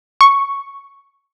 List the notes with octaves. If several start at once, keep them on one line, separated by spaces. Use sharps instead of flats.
C#6